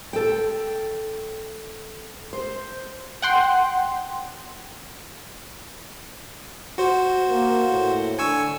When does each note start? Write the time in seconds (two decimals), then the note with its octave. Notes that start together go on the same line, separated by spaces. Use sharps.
0.13 A4 G5
2.33 C5
3.22 F#5 G5 C6
6.78 F#4 C5
7.29 A#3
7.70 A2
8.19 D3 G#5 C#6 E6